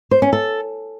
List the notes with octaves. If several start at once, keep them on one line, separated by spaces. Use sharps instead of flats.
C5
C#4
A4